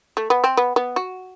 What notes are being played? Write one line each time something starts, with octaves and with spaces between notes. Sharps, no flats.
A3
B3
C4
B3
B3
F#4